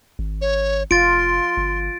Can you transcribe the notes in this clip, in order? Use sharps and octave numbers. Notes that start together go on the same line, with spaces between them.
G#1
C#5
F1 F4 C6 A6 D7
G1